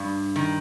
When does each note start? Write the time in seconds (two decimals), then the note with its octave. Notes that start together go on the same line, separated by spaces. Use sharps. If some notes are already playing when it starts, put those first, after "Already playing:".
Already playing: G2
0.36 D#3